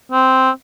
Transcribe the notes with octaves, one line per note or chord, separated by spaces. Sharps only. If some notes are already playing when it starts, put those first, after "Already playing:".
C4